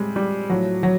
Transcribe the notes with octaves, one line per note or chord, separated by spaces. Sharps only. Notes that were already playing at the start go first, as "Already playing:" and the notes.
Already playing: A2 G3 G#3 C4
G3
A2 F3 F#3
F#3